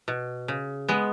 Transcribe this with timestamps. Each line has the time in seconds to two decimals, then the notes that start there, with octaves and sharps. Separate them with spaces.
0.08 B2
0.48 C#3
0.88 G#3 B3